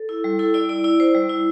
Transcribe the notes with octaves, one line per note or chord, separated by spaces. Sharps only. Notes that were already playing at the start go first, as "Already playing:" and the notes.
Already playing: A4
E4
G3
E4 A4
E4 D5
E4 D5
E4 D5
E4 C5
G3
E4